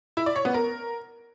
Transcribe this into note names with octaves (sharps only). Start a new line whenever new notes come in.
E4
D5
C#5
B3
A#4